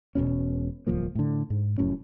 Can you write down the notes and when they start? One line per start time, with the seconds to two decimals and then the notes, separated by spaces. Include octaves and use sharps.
0.15 E1 A#1 B2 C#4
0.87 D1 C2 F3 A#3
1.15 A2 D3
1.50 G#2
1.78 F1 F#2 A2 C#4